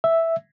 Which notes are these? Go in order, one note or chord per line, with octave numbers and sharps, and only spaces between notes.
E5